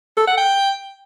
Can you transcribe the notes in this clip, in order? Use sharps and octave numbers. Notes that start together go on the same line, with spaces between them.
A4
F#5
G5